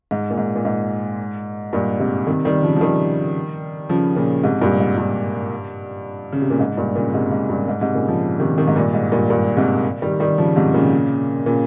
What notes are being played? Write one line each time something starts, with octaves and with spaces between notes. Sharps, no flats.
G#2
A#2
G#2
A#2
G#2
G2 A#2
G#2 C3
C3 D#3
D#3 G3
C#3 F3
F3
D#3 G3
C#3 F3
A#2 C#3
G#2 C3
G2 A#2
G#2
G2
C#3
C3
A#2
G#2
G2 A#2
A#2 C#3
G#2 C3
G#2
G2
G#2
G#2 C3
A#2 C#3
C#3 F3
C3 D#3
C3 D#3
G#2
G2 A#2
G#2
G2 A#2
G2 A#2
G#2 C3
D#3 G3
D#3 G3
C#3 F3
G#2 C3
A#2 C#3
A#2 C#3